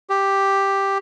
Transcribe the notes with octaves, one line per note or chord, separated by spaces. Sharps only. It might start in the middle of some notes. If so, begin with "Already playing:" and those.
G4